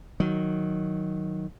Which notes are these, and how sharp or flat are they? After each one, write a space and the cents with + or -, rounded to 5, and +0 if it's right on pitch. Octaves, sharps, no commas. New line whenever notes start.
D#3 +0 F#3 +0